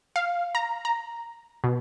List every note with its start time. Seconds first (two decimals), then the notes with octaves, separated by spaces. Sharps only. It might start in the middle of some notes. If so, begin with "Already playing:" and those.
0.16 F5
0.55 A#5
0.85 A#5
1.64 B2